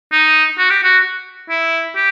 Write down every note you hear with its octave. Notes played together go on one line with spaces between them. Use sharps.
D#4
F#4
G4
F#4
E4
G4